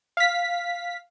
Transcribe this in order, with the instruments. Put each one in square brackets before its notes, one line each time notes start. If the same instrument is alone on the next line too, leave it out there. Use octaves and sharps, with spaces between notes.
[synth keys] F5 B6